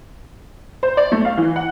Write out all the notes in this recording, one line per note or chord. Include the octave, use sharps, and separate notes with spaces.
C5
D5
A3
F5
E3
F#5